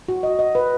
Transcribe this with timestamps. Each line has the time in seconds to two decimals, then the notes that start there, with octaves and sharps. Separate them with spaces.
0.09 F#4
0.23 D#5
0.39 D#5
0.55 B4